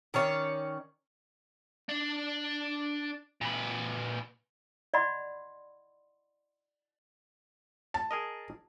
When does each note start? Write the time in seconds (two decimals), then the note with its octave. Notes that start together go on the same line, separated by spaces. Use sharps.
0.14 D#3 C#4 C#5 D5
1.89 D4
3.41 A#2 B4
4.94 D5 D#5 F#5 B5 C6
7.94 A5
8.11 G#4 A#4 D#5